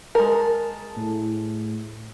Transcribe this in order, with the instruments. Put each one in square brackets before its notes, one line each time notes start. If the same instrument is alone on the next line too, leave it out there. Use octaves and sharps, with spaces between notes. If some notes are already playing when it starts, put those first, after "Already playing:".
[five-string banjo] G#3 A#4 [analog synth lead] A5
[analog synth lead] A2